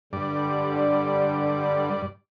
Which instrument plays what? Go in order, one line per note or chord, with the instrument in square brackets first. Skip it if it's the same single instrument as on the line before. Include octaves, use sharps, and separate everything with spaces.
[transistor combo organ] G2 D5 [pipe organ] D3 G3